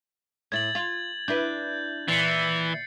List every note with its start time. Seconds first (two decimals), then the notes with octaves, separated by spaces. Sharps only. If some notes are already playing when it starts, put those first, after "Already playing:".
0.52 A2 E4 G#6 A6 F#7
0.75 F4
1.28 D4 E4 B4 G6
2.08 A#2 E3 A6 C7 C#7